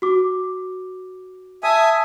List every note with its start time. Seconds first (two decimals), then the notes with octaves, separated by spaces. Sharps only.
0.02 F#4 D6
1.63 E5 G#5 A5 D#6